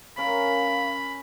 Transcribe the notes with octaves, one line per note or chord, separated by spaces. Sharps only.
C#4 A#4 F5 B5